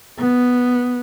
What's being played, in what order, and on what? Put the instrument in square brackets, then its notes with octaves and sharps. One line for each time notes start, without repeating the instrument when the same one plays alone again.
[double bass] B3